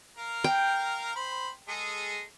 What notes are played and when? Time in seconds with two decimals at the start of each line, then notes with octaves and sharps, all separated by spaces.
0.17 A#4 F5
0.44 G5
1.16 C5 B5
1.68 G#3 G#4 A4